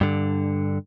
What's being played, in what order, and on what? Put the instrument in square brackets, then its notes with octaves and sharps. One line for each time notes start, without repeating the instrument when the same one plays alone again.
[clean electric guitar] G2 D3